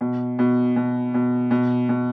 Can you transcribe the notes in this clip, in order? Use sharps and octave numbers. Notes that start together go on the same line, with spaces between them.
B2
B2
B2
B2
B2
B2